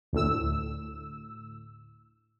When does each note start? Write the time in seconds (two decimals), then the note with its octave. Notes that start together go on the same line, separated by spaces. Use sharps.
0.13 D2 A2 E6